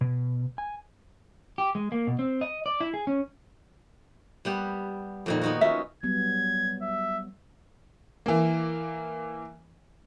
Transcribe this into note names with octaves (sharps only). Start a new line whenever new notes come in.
B2
G#5
G4
G#3
A#3
B2
C4
D#5
D5
E4
G#4
C#4
G3 B3 G4
F2 A#2 D#3
B3 D#4 F#4
C#4 F4 E5
F#3 G3 B3 G#6
E5
E3 A#3